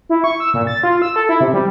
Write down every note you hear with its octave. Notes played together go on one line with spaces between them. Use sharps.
E4
C#6
E6
A#2
A6
F4
E6
A4
E4
C3
G3